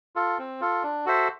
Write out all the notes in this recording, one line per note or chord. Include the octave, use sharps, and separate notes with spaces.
F4 A4
C4
F4 A4
D4
F#4 A4 C5 E5